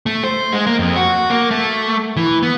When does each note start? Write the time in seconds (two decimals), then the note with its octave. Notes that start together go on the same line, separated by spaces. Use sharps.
0.06 A3
0.24 C5
0.53 G#3
0.67 A#3
0.79 F2
0.96 F#4
1.30 A#3
1.51 A3
2.17 E3
2.43 B3